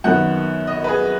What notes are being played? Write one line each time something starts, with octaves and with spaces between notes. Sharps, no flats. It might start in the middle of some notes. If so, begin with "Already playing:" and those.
F#2 D#3 B3 F#5
D#5
B4
G#4